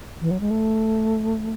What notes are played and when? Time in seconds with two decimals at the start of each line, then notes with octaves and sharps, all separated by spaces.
0.21 E3
0.31 F#3
0.40 G#3
0.51 A3